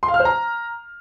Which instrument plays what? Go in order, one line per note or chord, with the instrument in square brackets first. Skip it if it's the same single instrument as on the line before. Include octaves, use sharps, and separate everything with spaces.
[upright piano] C6
F5
F6
C5
A#5